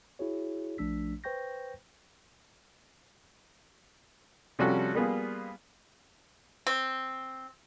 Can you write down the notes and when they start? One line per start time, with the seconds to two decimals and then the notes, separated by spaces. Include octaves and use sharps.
0.19 E4 F#4 G#4 C#5
0.78 A#1 F3 A3 D4 E6 B6
1.24 B4 C5 G5 C#6 G6 A#6
4.59 C3 F3 G3 C#4 F#4 A4
4.95 G3 A#3 B3 F4 G#4
6.67 C4